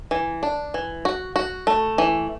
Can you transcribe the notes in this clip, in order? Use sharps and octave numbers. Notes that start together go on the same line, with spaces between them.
E3
D4
E3
F#4
F#4
A3
E3